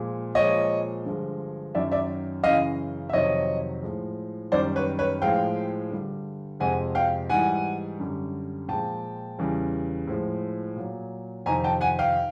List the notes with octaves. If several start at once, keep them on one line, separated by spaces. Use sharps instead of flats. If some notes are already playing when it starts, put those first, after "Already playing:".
Already playing: A#2 F3 G#3
A#2 F3 G#3 C#5 D#5
G2 D3 F3 G#3
F#2 D#3 F#3 D5 E5
D5 E5
F#2 C#3 E3 D#5 F5
E5
F2 C3 D#3 F#3 C#5 D#5
A2 F3 G#3
F#2 D#3 G3 C5 D5
B4 C#5
B4 C#5
A2 F3 G#3 F5 G5
G2 D3 G3
F2 C3 F3 G#3 F#5 G#5
F5 G5
G#2 E3 G3 F#5 G#5
F#2 D3 G3
A#2 F3 G#3 G5 A5
E2 C#3 E3 G3
A2 F3 G#3
A#2 F#3
F2 C3 D#3 G#5 A#5
G5 A5
F#5 G#5
F5 G5